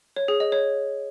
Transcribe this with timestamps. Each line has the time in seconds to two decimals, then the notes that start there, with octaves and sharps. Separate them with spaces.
0.16 C#5
0.28 G#4
0.40 D#5
0.52 C#5